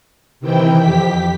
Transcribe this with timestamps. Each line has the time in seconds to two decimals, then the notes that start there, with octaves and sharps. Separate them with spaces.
0.40 C3 D#3 E3 E4 G5
0.78 F2 G4 B6